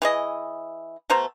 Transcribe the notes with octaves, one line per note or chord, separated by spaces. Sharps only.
E3 G#4 D#5
B2 A3 C5 A#5